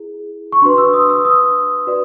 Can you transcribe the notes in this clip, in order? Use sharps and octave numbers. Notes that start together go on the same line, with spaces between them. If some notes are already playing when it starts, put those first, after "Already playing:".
Already playing: E4 G#4
C#6
D4 F#4 B4 C6
E6
D#6
E6
D#6
F#4 B4 D5